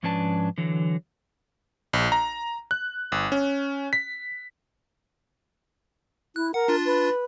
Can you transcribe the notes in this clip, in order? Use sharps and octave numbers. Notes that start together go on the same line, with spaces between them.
G#2 F3 C#4 D4 B4 A5
D3 E3 F#3
A#1
A#5
F#6
G1
C#4
B6
E4 F#6
A#4 F#5
D4 F4 A6
B4